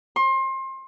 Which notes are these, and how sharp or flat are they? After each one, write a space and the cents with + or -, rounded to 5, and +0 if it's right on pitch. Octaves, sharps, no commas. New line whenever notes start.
C6 +30